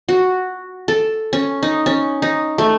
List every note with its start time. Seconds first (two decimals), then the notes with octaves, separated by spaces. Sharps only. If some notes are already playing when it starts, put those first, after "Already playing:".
0.09 F#4
0.88 A4
1.33 C#4
1.63 D#4
1.86 C#4
2.22 D#4
2.58 A3